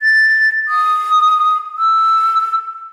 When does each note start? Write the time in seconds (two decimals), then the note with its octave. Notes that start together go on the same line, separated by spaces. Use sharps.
0.02 A6
0.68 D#6
1.78 E6